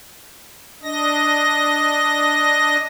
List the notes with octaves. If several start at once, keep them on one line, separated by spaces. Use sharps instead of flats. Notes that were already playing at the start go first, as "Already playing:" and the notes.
D4 D#5 A#6